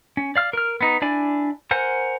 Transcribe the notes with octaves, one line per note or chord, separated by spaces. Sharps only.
C#4
D5 F5 F6
A#4 F6
B3 D#4
D4 E4 D5 G#5
A#4 C5 F#5 G#5